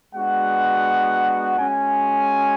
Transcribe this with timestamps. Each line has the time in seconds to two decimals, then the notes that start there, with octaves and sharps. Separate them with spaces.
0.15 G#3 B3 D4 F#4 F#5
1.59 G#3 C#4 F#4 G#5